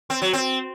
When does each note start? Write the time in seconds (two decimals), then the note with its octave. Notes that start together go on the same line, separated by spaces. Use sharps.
0.10 C4
0.22 F#3
0.33 C4